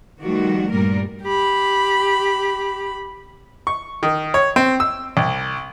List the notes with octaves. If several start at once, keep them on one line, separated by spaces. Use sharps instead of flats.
D#3 F3 G3 A3 F#4
G2 A#2 G3 A#4
G4 B5
C#6
D#3
C#5
C4
E6
C2